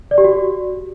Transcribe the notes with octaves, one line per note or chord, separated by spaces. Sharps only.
D5
G4
F#4